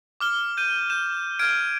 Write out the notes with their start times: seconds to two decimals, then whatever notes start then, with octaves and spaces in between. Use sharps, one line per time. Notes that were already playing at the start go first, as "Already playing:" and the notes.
0.20 D6 F6 G7
0.57 G6 D#7
0.90 G6 E7
1.39 F6 G#6 D7